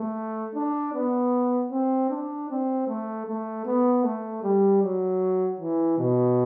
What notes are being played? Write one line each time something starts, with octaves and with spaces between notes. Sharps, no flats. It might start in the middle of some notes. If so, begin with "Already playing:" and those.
Already playing: A3
D4
B3
C4
D4
C4
A3
A3
B3
A3
G3
F#3
E3
B2